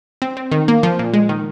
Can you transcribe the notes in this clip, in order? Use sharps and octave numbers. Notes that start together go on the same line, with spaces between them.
C4
C4
D#3
A#3
F3
A#2
G#3
D#3